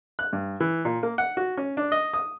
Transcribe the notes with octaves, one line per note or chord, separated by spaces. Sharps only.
F#6
G2
E3
A#2
A#3
F#5
F#4
C#4
D4
D#5
D#6